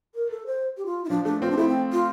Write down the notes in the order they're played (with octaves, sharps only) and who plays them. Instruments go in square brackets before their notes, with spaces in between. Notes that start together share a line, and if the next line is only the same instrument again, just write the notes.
[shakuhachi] A#4
A4
C5
G4
F4
E4
[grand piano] F3 [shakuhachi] D4
[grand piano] A3 [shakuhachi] D4
[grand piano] C4 [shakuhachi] F4
[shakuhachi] D4
[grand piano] A3 [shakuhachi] E4
[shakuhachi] C4
F4